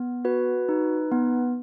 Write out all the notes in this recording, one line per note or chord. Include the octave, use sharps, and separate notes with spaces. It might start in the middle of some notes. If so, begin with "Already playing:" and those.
Already playing: B3
F#4 B4
D#4
B3